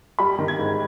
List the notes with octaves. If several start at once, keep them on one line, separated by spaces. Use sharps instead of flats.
G3 B5
D#3
G#6
G#2